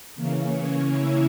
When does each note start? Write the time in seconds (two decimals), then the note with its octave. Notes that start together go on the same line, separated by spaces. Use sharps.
0.15 C#3 E3 A#3 C#4
0.53 C#5
0.90 E4 E5